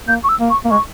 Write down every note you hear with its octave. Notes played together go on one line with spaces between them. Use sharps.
A#3 G6
C#6
E6
A#3
C#6
A#3
G#3 C#6